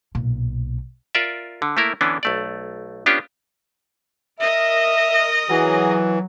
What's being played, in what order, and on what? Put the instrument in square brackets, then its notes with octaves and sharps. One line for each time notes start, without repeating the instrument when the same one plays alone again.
[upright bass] B1 A#2
[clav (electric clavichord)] F4 A#4 D5 E5
D3
A3 A#3 E4 A#4
D3 E3 B3 C#4 D4
B1 A3 D5
B3 C#4 D4 F4 G4
[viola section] A#4 D#5 [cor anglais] E5
[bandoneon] E3 [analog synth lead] F#3 [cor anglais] G#4